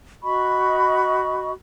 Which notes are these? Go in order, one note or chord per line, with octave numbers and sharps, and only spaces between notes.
F#4 D#5 B5 C#6